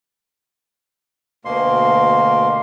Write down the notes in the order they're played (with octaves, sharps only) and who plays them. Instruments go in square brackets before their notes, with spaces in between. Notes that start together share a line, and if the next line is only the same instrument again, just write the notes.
[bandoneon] D2 B2 A#3 C6